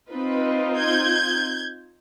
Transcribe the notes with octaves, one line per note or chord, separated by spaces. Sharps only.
C4 D#4 F4 B4
G6 G#6